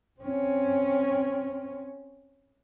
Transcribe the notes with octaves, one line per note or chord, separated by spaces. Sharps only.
C4 C#4